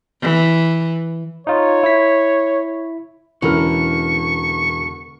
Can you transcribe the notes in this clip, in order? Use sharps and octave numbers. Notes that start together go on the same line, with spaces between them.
E3
D#4 F4 C#5
E4 B6
E1 D3 E3 C#4 A#4 C#6 F6